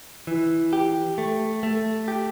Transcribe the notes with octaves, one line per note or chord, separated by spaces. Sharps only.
E3
G4
A3
A3
G4